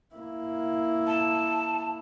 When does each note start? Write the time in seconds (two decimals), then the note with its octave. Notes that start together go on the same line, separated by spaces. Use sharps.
0.15 A#3 E4
1.07 A5